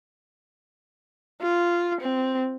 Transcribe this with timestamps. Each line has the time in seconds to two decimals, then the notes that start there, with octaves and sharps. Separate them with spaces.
1.41 F4
2.01 C4